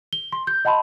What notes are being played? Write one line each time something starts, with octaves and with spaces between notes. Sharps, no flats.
G7
C6
G6
D#5 F#5 A5 B5 C6